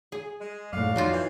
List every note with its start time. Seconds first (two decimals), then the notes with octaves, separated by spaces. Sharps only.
0.12 G#4
0.40 G#3
0.73 F#2 A2 F#4 D5 F5
0.96 F2 F#3 D#4 F4
1.13 E3 C5